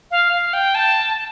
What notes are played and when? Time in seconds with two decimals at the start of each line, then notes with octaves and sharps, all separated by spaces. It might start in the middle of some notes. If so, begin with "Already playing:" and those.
0.11 F5
0.33 F5
0.53 G5
0.75 A5